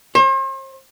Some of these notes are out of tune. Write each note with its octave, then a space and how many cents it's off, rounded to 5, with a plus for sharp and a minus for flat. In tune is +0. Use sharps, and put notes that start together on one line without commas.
C5 +40